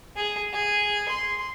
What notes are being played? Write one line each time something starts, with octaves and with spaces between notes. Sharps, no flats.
G#4
G#4
C6